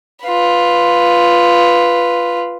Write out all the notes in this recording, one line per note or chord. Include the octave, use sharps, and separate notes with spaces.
F4 B4